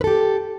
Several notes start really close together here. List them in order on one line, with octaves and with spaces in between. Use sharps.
B4 A4 G4